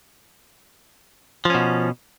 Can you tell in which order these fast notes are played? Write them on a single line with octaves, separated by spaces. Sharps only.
F3 C#4 B2